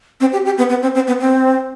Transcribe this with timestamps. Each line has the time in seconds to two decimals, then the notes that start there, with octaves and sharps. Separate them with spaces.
0.20 C4
0.33 G4
0.46 G4
0.58 B3
0.70 B3
0.83 C4
0.95 C4
1.07 B3
1.20 C4